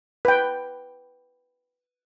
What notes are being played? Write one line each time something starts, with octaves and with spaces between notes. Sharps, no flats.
B4 G5